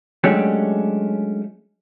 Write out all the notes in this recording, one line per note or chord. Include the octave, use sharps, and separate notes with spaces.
F#3 G#3 A3 C#4 D4 G4